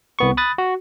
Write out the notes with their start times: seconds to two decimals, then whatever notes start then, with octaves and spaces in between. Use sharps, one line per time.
0.19 C2 B3 C#6
0.37 B5 D#6 F#6 A6
0.58 F#4